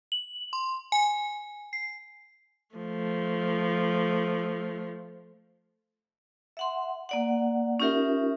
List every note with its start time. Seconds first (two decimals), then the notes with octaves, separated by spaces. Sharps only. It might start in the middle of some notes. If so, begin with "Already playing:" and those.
0.12 F#7
0.53 C6
0.92 G#5
1.73 C7
2.75 F3 A3
6.57 E5 F#5 C6
7.09 A#3 D5 F#5
7.80 C#4 D#4 F4 G4 A#4 E5